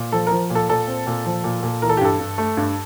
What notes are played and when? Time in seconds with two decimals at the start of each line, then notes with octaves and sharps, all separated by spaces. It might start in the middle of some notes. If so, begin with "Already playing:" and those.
Already playing: A#2
0.12 F3 A4
0.27 F3 A#4
0.50 A#2
0.55 A4
0.69 A#2 A4
0.87 C4
1.07 A#2
1.26 F3
1.44 A#2
1.63 A#2
1.82 E3 A#4
1.89 A4
1.97 G4
2.01 G2 A4
2.20 G2
2.38 A3
2.57 G2